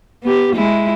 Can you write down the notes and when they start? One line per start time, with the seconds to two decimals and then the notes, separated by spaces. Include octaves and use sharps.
0.23 B3 G4
0.55 G#3 E4